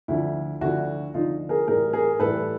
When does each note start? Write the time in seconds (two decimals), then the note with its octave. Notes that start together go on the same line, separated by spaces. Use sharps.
0.08 D2 D3 F3 E4
0.61 D2 D3 F3 E4 F#4
1.14 D2 D3 F3 D#4 F4
1.49 G#4 A#4
1.68 A2 E3 G3 G#4 A#4
1.93 G#4 A#4
2.20 A2 E3 G3 A4 B4